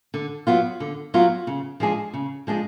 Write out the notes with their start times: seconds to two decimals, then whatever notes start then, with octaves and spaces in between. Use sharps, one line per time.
0.14 D3
0.47 F#3 B3 F4
0.80 D3
1.14 F#3 B3 F4
1.47 C#3
1.80 F3 G#3 D4 G#4
2.14 C#3
2.47 F3 G#3 D4 G#4